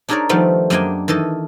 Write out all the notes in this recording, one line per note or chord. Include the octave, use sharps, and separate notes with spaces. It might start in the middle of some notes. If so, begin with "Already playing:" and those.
D4 D#4 G#4 A#4 C#5 D5
D#3 F3 G3 A3 B3 C4
F#2 A#3 D4 D#5 G5 G#5
D#3 E3 A4 D#5